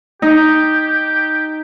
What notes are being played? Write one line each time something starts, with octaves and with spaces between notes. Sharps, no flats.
D#4 G4